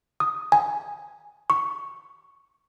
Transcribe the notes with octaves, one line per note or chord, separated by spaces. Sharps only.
D#6
G#5
C#6